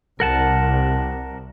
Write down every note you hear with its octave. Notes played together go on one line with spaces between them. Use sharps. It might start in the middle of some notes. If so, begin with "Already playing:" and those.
C2 A#4 F#5 A5